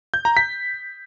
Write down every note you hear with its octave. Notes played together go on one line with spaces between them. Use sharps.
G6
A#5
B6